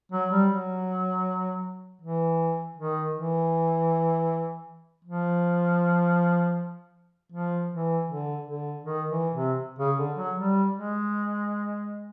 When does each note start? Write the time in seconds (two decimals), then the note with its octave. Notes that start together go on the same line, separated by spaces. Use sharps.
0.12 F#3
0.31 G3
0.49 F#3
2.01 E3
2.77 D#3
3.15 E3
5.05 F3
7.32 F3
7.71 E3
8.08 D3
8.46 D3
8.84 D#3
9.09 E3
9.35 C3
9.79 C#3
9.98 D3
10.17 F#3
10.36 G3
10.73 G#3